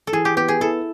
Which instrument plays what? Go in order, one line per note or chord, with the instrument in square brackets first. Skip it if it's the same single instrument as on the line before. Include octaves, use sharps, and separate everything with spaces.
[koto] A4
[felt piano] E3 [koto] G#4
[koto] G4
[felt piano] B3 [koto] G4
[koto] G#4
[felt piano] E4 [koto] A4